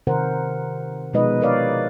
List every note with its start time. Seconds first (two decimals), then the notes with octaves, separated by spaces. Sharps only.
0.07 C3 D#3 C4 A#4 C5 F#5
1.13 B2 F3 G#3 D#4 B4 D#5
1.41 D#4 A#4 B4 C#5 D5 F5